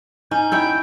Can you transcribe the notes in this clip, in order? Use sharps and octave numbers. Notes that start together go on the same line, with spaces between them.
C#4 D#4 G6
E4 C#5 G5